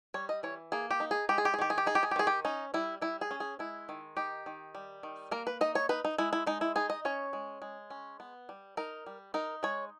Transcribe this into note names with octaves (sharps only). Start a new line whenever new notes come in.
G3 C#5
D#5
E3 C#5
A#3 G#4
G4
D#4
G#4
G#3 G4
G#4
G4
G#4
D#3 G4
G#4
G4
D#4 G#4
G4
G#4
G4
D#3 G#4
G4
C#4 D#4
G3 E4
G3 E4
G#4
C#4
G#4
G#3 E4
D#3
D#4 G4
D#3
G3
D#3
A#3 A#4
B4
D#4 D#5
C#5
D#4 B4
D#4
G#3 E4
E4
G#3 D#4
E4
D#4 G#4
D#5
C#4 C#5
G#3
G#3
C#4
B3
G3
D#4 A#4
G3
D#4 A#4
G#3 C#5